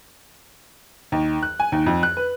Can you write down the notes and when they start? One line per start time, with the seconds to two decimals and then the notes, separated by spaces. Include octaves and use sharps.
1.12 D#2
1.43 F#6
1.60 G#5
1.72 D#2
1.86 F2
2.03 F#6
2.17 B4